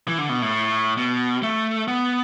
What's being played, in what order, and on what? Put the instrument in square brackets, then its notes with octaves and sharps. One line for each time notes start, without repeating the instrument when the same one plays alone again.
[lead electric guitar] E3
D3
B2
A2
B2
A3
B3